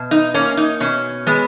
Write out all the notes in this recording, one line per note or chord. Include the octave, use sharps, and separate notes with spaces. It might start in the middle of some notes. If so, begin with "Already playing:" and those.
Already playing: B2
D#4
A#3 C#4
D#4
B2 C#4
G#3 B3